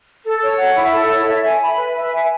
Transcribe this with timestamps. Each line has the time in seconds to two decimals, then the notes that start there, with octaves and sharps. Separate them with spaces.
0.25 A4
0.42 C#5
0.59 F#5
0.76 E4
0.94 A4
1.10 C#5
1.28 E5
1.45 G#5
1.62 B5
1.78 B4
1.96 E5
2.13 G#5